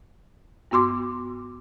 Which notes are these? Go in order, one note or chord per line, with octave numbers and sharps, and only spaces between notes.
G2 B3 F#4 C6 D6